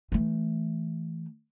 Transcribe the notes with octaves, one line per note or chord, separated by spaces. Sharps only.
E3 A3